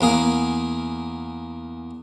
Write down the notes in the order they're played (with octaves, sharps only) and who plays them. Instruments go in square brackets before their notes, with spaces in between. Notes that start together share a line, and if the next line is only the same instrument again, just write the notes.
[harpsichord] E2 A#3 G#4